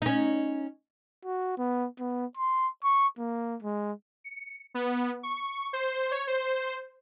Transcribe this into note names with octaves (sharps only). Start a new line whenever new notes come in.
C#4 D#4
F#4
B3
B3
C6
C#6
A#3
G#3
C#7
B3
C#6
C5
C#5
C5